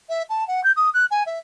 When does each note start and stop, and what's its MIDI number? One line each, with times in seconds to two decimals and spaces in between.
0.09 0.22 76
0.29 0.46 81
0.47 0.60 78
0.63 0.71 91
0.76 0.89 87
0.93 1.05 90
1.10 1.23 80
1.26 1.38 76